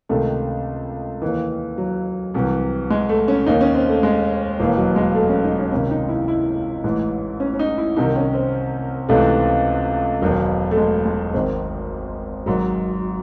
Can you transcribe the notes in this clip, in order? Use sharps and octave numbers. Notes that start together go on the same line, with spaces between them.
C#2 C3 D#3 A3
D#2 D#3 E3
F#3
C2 C3 E3
G#3
A3
C#4
D#2 D#3 D#4
C#4
C4
A3
G#3
E1 D#2 D#3 E3
F#3
G#3
A3
C#4
D#4
C#4
C#2 C3 D#3 C#4
D#4
E4
E4
A1 G#2 E3
C#4
C#4
D#4
E4
C2 C3 D#3 D#4
C#4
C4
C#2 C3 E3 A3
E1 E2 D#3 F#3
A3
G#3
G#3
G#1 G#2 D#3 C4
G#1 G#2 D#3 F#3